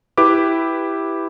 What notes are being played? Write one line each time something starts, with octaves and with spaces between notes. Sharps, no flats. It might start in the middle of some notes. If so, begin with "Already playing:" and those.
E4 G4 B4 D6